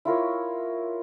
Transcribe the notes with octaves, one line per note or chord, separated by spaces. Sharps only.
E4 F4 A#4 C#5